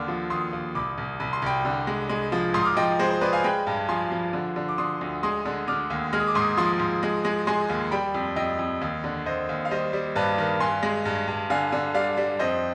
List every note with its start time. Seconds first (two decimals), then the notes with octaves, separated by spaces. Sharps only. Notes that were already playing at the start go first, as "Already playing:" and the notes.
Already playing: D#2 D3 D6 F6
0.08 F3
0.30 D#2 C6 D#6
0.53 D#2
0.75 C2 B5 D6
0.98 C2
1.20 C2 B5
1.33 C6
1.42 C2 G5 B5
1.65 D3
1.87 G#3
2.09 G#3
2.32 F3
2.54 G#2 C6 D#6
2.65 D6 F6
2.77 F3 D#5 G5
2.99 G#3 C5
3.10 C5
3.21 G#3 B4 D5
3.33 F5 G#5
3.44 G#3 G5 B5
3.67 G2
3.89 F3 G#5 C6
4.11 F3
4.33 D3
4.56 D3
4.69 D6
4.78 D3 C6 D#6
5.01 D2
5.23 G#3 C6 D#6
5.45 D3
5.68 D3 D6 F6
5.90 D#2
6.13 G#3 F6
6.20 D#6
6.28 D6
6.35 G#2 C6 D#6
6.57 F3 C6 D#6
6.79 G#2
7.03 G#3
7.25 G#3
7.47 G#3 G#5 C6
7.69 D#2
7.91 G3 G5 B5
8.14 F2
8.36 F2 D#5 G5
8.59 F2
8.81 D#2
9.04 D3
9.26 D#2 C5 D#5
9.49 D#2
9.65 F5
9.71 G3 C5 D#5
9.93 G3
10.16 G2 B4 D5
10.38 D#3
10.60 G2 G#5 C6
10.83 G#3
11.05 G2
11.27 G2
11.50 D3 F5 G#5
11.72 D3
11.94 G3 D5 F5
12.17 G3
12.39 F2 C5 D#5